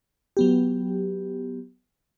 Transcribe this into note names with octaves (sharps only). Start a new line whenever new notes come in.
F#3 B3 G4